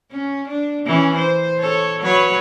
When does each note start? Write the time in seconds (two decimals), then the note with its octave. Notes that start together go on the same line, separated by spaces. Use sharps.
0.11 C#4
0.48 D4
0.86 E3 C#4
1.17 C5
1.59 A4 C#5
2.01 F#3 B4 C#5